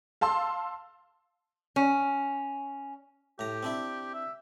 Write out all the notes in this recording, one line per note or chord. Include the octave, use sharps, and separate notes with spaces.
F5 A5 C6 E6
C#4
A2 G4 A#5
C4 D4 E4
E5